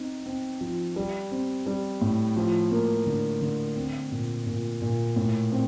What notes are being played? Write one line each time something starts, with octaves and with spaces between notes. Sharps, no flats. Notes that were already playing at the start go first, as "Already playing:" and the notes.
Already playing: C4 D#4
C4
F3
G3
C4
G3
A2
F3
A#3
D3
D3
C4
A#2
A#2
A#2
A2
C4